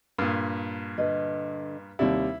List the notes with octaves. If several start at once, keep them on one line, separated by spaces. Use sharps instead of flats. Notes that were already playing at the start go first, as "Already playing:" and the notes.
G2 A#2
D3 B4 D#5
D#2 C3 G3 E4 C#5